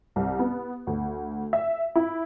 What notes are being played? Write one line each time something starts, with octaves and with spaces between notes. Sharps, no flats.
C2
B3
D2
E5
E4